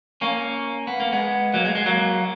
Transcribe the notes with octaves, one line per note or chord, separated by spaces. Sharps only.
A#3 C#4
B3
A#3
G#3 B3
F#3 A#3
G#3
G#3
F#3 A#3